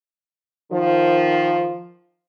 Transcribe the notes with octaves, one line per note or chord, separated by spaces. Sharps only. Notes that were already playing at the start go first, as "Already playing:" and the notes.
D#3 F3